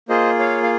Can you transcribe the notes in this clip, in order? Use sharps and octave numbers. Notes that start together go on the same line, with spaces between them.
A#3 F4 G#4 C5 D#5
C#5 F5
F5